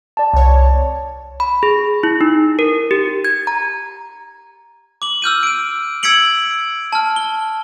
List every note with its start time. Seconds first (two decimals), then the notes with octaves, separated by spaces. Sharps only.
0.17 D5 A5
0.33 C2 C#5
1.40 B5
1.63 G#4
2.03 E4
2.21 D#4
2.59 A#4
2.91 G4
3.25 G#6
3.47 A#5
5.02 D6 F#7
5.22 E6 F6 G6 D#7
5.43 D7 D#7
6.03 E6 G#6 B6 C#7 D7 F#7
6.93 A5 F6
7.16 G7